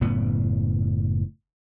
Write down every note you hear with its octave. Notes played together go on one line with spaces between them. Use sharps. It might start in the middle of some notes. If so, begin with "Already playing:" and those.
F#1 A2 B3